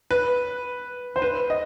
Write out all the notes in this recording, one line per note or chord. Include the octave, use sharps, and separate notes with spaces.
B4
C5
B4
D#5